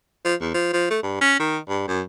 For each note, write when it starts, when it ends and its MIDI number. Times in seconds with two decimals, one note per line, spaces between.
0.25 0.34 53
0.41 0.52 40
0.54 0.72 53
0.73 0.86 53
0.90 0.99 57
1.03 1.18 43
1.21 1.36 61
1.39 1.58 51
1.69 1.88 43
1.88 2.02 42